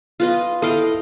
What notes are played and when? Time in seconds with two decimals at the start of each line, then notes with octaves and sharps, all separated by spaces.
0.20 F4 B4 D#5
0.62 E4 A4 D#5 F5 G5